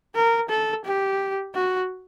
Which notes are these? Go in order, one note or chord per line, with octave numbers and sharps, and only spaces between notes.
A#4
A4
G4
F#4